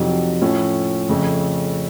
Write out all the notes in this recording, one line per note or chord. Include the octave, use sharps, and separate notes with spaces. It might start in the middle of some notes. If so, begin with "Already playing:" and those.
Already playing: F2 C3 F#3 D#4
A2 F3 A3 C#4
F2 C#3 A3